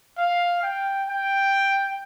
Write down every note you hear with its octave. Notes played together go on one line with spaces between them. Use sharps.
F5
G5
G5